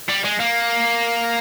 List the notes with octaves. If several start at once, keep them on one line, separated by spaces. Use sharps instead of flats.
G3
G#3
A#3